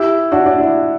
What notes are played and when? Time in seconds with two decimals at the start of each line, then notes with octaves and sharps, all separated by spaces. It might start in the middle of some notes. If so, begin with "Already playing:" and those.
Already playing: E4 G4
0.32 D4 F#4
0.46 D4
0.60 E4